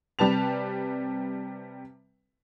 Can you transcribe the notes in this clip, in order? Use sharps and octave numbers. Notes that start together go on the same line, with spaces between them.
C3 G3 B4 A5 F7